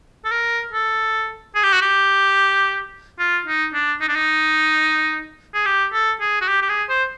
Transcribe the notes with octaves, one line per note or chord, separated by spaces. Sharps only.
A4
A#4
A4
G#4
G4
F#4
G4
F4
D#4
D4
D#4
D4
D#4
G#4
G4
A4
G#4
F#4
G4
G4
G#4
C5